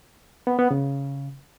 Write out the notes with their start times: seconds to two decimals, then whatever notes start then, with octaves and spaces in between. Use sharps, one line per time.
0.47 B3
0.59 B3
0.71 C#3